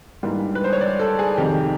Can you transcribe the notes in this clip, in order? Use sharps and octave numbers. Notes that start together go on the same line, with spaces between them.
G#2 E3 G3 A#3 D4
B4
C5
C#5
D5
A4
G#4
F2 C3 D#3 G4